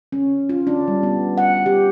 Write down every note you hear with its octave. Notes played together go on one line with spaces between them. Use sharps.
C#4
F4
D4
G3
B3
F#5
G4